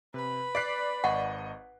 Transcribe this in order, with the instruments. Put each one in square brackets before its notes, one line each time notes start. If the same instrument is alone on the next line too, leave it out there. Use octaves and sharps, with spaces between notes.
[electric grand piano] C3 [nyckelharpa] B4 B5
[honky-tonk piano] D5 C7 [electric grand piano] F#6 B6 D7
[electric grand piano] G#1 D#5 C#6 [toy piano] F#5